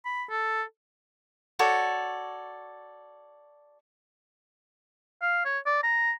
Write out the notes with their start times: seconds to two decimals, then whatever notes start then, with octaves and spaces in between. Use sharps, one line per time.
0.05 B5
0.30 A4
1.59 F#4 A4 C#5 D5
5.22 F5
5.45 C#5
5.66 D5
5.83 A#5